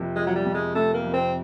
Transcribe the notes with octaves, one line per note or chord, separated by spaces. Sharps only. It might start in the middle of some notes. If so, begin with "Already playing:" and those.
Already playing: F2 C3 F3 A#3
F3 G#3
F#3
G3
F2
G#3
C3 A3
A#3
F2
C4